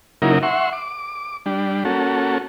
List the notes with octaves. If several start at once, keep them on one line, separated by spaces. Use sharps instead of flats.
C#3 F#3 A#3 D#4 E4 A#4
E5 F#5 C6 C#6
D6
G3 D4
A#3 C#4 F#4 A4